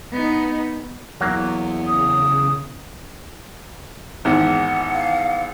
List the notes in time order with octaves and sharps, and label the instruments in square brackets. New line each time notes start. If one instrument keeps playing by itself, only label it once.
[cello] B3 D#4
[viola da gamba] E2 [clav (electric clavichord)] F#3 A#3
[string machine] C#3 [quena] D#6
[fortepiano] G#1 E2 [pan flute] F#5
[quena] F5